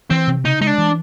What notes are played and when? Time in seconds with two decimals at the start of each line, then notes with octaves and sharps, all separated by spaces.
0.10 E3 C4
0.27 C3
0.44 C#3 D#4
0.61 G#3 D#4
0.67 D4
0.78 E3